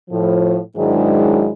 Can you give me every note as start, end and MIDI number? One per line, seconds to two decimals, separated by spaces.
0.10 0.57 45
0.10 0.57 53
0.77 1.51 44
0.77 1.51 51
0.77 1.51 54
0.77 1.51 56
0.77 1.51 62
0.77 1.51 64